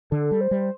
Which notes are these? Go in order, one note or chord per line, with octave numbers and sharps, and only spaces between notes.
D3 A4
G3
C5
G3